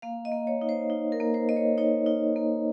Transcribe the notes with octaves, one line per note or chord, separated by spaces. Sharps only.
A#3 F5
D#5
A#3
C#5
D#4
C5
D#4
A#4
A#3
C5
A#3 D#5
C#5
D#4 C#5
D#4
A#3